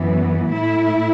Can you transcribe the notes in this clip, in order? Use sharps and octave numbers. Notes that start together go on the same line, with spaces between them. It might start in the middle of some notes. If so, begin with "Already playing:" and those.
Already playing: F#2 E3 B3
A2 A3 E4